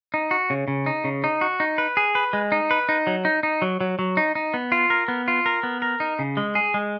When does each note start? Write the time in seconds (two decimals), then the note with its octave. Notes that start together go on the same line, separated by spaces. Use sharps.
0.14 D#4
0.31 F#4
0.50 C#3
0.68 C#3
0.86 D#4
1.04 C#3
1.24 D#4
1.41 F#4
1.60 D#4
1.78 B4
1.97 G#4
2.15 B4
2.33 G#3
2.52 D#4
2.71 B4
2.89 D#4
3.07 F#3
3.25 D#4
3.43 D#4
3.62 F#3
3.81 F#3
3.99 F#3
4.17 D#4
4.35 D#4
4.54 B3
4.72 F4
4.90 A#4
5.08 B3
5.28 F4
5.46 A#4
5.63 B3
5.82 A#4
6.00 D#4
6.19 C#3
6.37 G#3
6.55 G#4
6.74 G#3